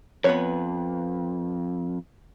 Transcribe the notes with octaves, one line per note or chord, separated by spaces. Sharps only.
F2 B3 B4 C#5